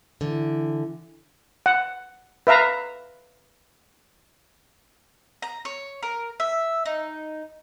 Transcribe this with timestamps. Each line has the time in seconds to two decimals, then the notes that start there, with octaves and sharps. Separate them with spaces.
0.21 D3 E3
1.66 F#5
2.47 B4 E5 F5 A#5
5.42 A#5
5.65 C#5
6.03 A#4
6.40 E5
6.86 D#4